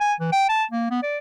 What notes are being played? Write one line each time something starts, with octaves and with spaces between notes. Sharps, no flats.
G#5
E3
G5
A5
A#3
B3
D5